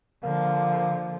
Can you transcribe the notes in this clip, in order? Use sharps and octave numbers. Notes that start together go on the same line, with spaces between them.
D3 F3 A#3